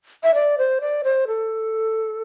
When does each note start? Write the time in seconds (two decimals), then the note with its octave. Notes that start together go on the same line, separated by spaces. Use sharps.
0.23 E5
0.34 D5
0.58 C5
0.81 D5
1.04 C5
1.28 A4